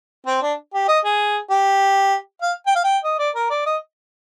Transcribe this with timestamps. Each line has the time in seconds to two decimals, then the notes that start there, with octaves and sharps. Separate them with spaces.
0.27 C4
0.42 D4
0.74 G4
0.88 D#5
1.05 G#4
1.50 G4
2.42 F5
2.66 G5
2.76 F5
2.84 G5
3.04 D#5
3.19 D5
3.35 A#4
3.50 D5
3.66 D#5